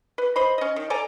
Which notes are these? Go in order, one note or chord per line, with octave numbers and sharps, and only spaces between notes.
B4
C5 D#5 B5
C#4 D#5
D#3
A4 D5 G#5 A#5